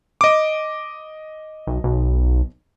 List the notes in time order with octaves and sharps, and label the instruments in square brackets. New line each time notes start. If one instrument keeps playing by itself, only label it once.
[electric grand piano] D#5 D6
[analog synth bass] B1
B1